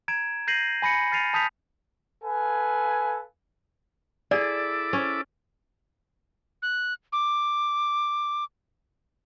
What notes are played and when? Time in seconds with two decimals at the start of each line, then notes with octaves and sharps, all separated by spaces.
0.08 A#5 G#6 D7 E7
0.48 G6 A#6 C7 D#7 F#7
0.82 G#5 B5 A#6 C#7
1.12 F6 A6 C7 D#7 F7
1.34 A5 D#6 G6 B6 F7
2.23 A4 B4 F5 G#5
4.31 E4 G#4 A4 D5 D6
4.93 C#4
6.62 F#6
7.13 D6